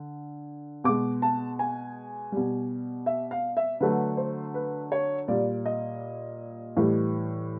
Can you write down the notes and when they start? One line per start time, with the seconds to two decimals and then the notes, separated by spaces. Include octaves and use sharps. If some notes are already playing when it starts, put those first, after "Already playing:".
Already playing: D3
0.84 B2 G#3 D6
1.22 A5
1.59 G#5
2.32 B2 G3
3.06 E5
3.31 F5
3.57 E5
3.80 D3 F#3 A3 B4
4.17 C5
4.54 B4
4.92 C#5
5.28 A#2 G3 D5
5.66 D#5
6.77 A2 E3 G3